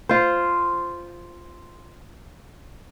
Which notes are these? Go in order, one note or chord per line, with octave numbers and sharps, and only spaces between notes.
F4 C5